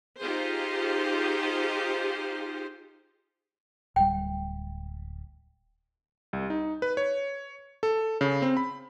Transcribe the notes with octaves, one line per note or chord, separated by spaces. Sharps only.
D#4 F4 G4 G#4 C5
D1 G3 G5
C2
D#4
B4
C#5
A4
C#3
C4
B5